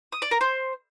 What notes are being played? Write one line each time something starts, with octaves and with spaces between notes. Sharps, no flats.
D#6
D5
A#4
C5